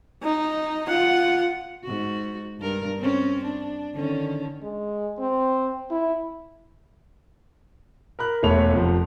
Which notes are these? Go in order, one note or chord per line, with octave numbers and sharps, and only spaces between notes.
D#4
F4 F#5
G#2 F#4
G2 A#4
C4 C#4
D4
D3 D#3 C#4
G#3
C4
E4
A#4 B5 F#6
E1 A3 C#5 B5 F7
F1 F3